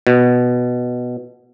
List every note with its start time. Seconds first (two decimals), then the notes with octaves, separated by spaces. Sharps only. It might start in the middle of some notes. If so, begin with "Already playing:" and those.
0.07 B2